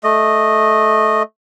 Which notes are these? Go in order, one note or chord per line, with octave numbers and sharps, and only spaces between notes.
A3 D#5